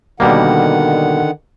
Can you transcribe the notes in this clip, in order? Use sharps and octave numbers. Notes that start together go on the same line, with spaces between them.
B2 D3 D#3 G3 A#3 F#5